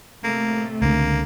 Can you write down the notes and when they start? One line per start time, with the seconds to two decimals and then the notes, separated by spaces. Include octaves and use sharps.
0.24 A2 C3 A3 A#3
0.82 C#2 D3 A#3